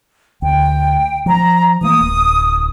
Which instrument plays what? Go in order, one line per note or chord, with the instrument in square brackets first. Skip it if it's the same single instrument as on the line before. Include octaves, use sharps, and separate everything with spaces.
[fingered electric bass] D2 [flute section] G5
[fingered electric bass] F3 [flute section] A#5
[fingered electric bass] E3 A3 A#3 [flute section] D#6
[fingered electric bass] D1